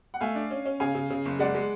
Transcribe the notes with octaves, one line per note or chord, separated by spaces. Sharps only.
F#5
A3 F5 G#5
D4
C#4
C#4
C#3 F5 G#5
C#3
C#3
F#1
G#3 D5 F#5
G#3